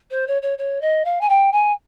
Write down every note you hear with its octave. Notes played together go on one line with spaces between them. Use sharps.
C5
C#5
C#5
C#5
D#5
F5
G#5
G5
G#5